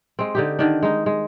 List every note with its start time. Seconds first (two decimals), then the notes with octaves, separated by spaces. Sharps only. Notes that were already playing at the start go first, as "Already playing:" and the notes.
0.19 G#3 C4
0.35 D3 D#4 G4
0.59 D3 D#3 D4
0.83 G#3 D#4
1.06 G#3